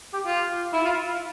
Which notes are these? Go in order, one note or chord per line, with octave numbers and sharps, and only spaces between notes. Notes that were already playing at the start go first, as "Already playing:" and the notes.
G4
F4
E4
F4